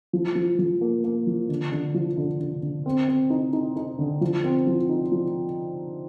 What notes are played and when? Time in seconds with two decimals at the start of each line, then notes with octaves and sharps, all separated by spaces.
0.13 F3
0.36 F3
0.59 F3
0.81 A#3
1.04 A#3
1.27 F3
1.49 D3
1.72 D3
1.94 F3
2.18 D3
2.40 D3
2.63 D3
2.86 C4
3.08 C4
3.30 D#4
3.53 D#4
3.76 D#4
3.99 D3
4.21 F3
4.44 C4
4.67 F3
4.89 D#4
5.12 F3